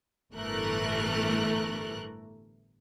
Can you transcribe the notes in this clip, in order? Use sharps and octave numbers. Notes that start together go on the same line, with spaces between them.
G1 A2 E3 A3 A#4 F#6